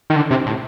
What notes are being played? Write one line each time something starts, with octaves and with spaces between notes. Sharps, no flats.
D#3
D3
C3
A2